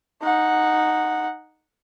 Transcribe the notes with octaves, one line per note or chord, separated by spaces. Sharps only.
D#4 F#5